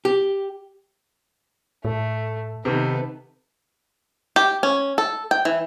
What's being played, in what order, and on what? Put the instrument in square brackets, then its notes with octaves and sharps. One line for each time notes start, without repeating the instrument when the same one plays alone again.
[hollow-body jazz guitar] G4
[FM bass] A2 [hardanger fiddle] A3 [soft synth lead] A4
[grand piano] C3 D#3 [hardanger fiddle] B3 A4 [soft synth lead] B4
[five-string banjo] G4
C#4
A4
G5
E3